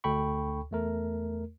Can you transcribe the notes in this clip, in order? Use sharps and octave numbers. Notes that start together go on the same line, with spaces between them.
D2 A4 G5 B5 C#6
E2 A3 A#4